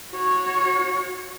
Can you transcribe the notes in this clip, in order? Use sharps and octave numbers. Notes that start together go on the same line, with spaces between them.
F#4 C#5